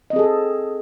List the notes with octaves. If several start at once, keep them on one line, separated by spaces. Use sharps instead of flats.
C4 G#4 A4 D#5